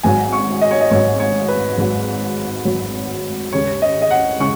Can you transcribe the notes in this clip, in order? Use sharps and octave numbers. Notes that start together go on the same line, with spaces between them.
G#1 G#2 F#3 G#5
C#6
D#5
C#5
D#5
G#1 G#2 F#3 C#5
C#5
B4
G#1 G#2 F#3
G#1 G#2 F#3
D#2 C#3 G#3 C#5
D#5
D#5
F#5
C#3 G#3 C#6